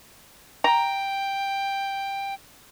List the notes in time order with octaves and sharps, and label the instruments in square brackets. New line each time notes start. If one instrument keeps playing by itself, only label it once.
[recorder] G5 [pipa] A#5